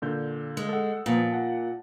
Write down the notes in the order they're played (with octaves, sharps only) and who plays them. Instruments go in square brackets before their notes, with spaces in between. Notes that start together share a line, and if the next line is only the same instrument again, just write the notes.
[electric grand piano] A#2 D3 G6
[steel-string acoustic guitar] G#3
[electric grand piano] A4 F#5
[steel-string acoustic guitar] A#2 [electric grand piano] F3 B3
[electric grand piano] F#5 A5